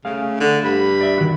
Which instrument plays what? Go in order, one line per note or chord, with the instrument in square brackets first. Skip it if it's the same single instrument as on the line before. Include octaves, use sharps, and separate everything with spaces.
[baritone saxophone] C#3 [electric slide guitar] A3 G#4 F5
[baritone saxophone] D3
[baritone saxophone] G2 [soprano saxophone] B5
[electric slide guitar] D5 E5
D#3 F#4